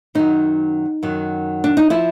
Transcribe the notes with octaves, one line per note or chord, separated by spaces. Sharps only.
F#2 D#3 F#3 D#4
F#2 D#3 F#3
D4
D#4
F3 E4